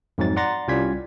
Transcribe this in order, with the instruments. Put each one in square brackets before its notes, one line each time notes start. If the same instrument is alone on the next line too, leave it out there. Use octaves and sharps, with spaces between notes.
[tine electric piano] F2 G#2 F#3 A6
D5 F#5 A#5 C6 A6 A#6
C2 G3 C#4 F4 G#6 B6